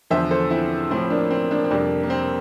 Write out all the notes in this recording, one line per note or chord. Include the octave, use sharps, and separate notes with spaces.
E2 D3 F3 C5 E5
A4 C5
C4 E4
A2 F3 C4 E4
A#3 D4
C4
A#3 D4
C4
F2 C3 G3 A#3 D4
A#3
C4